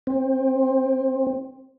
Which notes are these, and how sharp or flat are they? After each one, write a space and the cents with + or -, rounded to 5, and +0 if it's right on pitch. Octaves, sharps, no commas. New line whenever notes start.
C4 +20